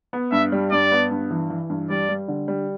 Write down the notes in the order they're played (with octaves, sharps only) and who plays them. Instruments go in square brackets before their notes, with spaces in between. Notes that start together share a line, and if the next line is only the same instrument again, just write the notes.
[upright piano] B3
[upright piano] G2 [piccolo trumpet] E5
[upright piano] G3
[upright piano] G2 [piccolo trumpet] D5
[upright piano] B3
G2
E3
E3
G2
[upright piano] G3 [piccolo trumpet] D5
[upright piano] G3
D3
G3